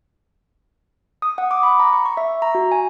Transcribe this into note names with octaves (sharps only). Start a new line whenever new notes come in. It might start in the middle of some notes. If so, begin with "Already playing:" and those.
D#6
F#5
D6
B5
A#5
C#6
C#6
E5
A#5
F#4
G#5